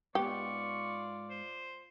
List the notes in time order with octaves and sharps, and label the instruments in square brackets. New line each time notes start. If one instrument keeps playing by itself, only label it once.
[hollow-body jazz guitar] G#2 B3 [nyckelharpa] F4 D5 [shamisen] G4 [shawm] C#6
[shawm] C5